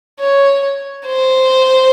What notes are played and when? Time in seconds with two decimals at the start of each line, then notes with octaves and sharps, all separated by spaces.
0.20 C#5
1.06 C5